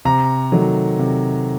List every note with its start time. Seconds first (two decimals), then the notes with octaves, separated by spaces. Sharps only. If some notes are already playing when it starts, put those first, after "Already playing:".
0.05 C3 A#5
0.52 D#3 F#3 A3
0.99 C3